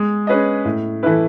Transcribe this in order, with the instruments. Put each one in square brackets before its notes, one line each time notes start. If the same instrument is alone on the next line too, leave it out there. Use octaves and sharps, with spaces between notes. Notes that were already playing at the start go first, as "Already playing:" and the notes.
Already playing: [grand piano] G#3
C#4 G#4 B4 D#5
A2
E3 A3 E4 B4